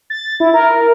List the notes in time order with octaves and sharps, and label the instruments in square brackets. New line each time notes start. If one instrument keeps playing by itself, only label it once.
[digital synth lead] A6
E4
A#4